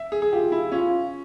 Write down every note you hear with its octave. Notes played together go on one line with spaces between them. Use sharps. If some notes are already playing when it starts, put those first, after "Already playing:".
Already playing: E5
G#4
G#4
F4 G4
E4
C#4 F4